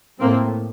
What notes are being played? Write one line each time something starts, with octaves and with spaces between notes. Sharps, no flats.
A2 A#3 C4